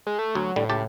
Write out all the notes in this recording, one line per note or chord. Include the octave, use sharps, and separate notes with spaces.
G#3
A3
D2 F#3
A2 D3 G3
C#2 G4 A5